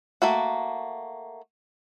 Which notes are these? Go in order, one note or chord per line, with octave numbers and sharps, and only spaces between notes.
A3 A#3 F#4